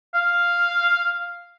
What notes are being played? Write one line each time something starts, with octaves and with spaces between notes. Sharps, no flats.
F5